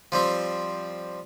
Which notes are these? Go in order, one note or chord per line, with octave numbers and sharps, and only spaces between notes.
F3 G3 C4